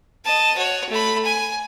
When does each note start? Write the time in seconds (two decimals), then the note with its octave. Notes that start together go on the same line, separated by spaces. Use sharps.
0.24 D#5 A5
0.57 F#4 C#5
0.90 A3 B5
1.25 G#5